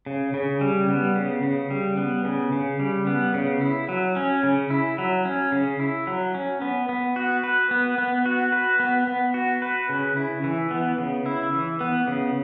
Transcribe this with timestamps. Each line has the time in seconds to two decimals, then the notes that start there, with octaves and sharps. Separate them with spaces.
0.06 C#3
0.34 C#3
0.61 G3
0.89 B3
1.16 C#3
1.43 C#3
1.71 G3
1.97 B3
2.25 C#3
2.52 C#3
2.80 G3
3.07 B3
3.34 C#3
3.61 E4
3.89 F#3
4.16 C#4
4.43 C#3
4.70 E4
4.98 F#3
5.25 C#4
5.52 C#3
5.80 E4
6.07 F#3
6.34 C#4
6.62 B3
6.89 B3
7.16 F#4
7.44 B4
7.71 B3
7.98 B3
8.26 F#4
8.52 B4
8.80 B3
9.07 B3
9.34 F#4
9.62 B4
9.89 C#3
10.17 E4
10.44 E3
10.71 B3
10.98 C#3
11.26 E4
11.53 E3
11.81 B3
12.07 C#3